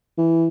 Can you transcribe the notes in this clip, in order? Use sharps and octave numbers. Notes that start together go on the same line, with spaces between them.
E3